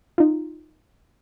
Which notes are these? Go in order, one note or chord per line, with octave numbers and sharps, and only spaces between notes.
D#4 F4